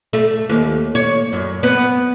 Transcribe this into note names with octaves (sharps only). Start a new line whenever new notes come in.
A3
D#2
C#5
F#2
B3